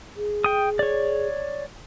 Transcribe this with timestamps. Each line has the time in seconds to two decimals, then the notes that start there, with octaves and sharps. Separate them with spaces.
0.17 G#4
0.44 G5 D#6
0.79 C#5 D5